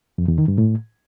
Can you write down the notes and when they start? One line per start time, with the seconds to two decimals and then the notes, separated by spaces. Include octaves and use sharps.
0.18 F2
0.28 E2
0.38 D#3
0.48 G2
0.58 A2